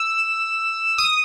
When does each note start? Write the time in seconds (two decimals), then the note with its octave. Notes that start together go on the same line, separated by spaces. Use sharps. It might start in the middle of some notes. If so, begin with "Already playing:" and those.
Already playing: E6
0.98 D#6